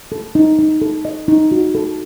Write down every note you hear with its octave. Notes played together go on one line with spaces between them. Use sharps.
A4
D#4
D#4
A4
D#5
D#4
F#4
A4